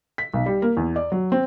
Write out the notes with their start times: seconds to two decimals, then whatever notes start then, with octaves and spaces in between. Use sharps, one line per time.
0.18 B6
0.34 B1
0.46 G3
0.62 A#3
0.77 E2
0.96 D5
1.12 F#3
1.32 C4